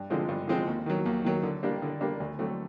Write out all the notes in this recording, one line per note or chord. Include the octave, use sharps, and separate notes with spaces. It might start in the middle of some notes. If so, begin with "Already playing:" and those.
Already playing: G2
D3 F3 G#3 C4
G2
D3 F3 G#3 C4
D#2
D#3 F#3
D#2
D#3 F#3
D3
G3 A#3 D4 G4
D3
G3 A#3 D4 G4
D2
D3 F#3 A3 C4